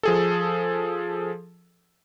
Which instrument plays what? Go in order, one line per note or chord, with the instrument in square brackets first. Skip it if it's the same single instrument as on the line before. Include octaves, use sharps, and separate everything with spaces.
[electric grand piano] F3 G#4 A4